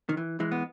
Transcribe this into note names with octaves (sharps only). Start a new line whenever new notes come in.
D#3
E3
E3 G#3
B3